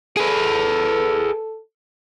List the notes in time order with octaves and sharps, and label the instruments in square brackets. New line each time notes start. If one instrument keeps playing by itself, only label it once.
[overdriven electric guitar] G#4 B4 [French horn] A4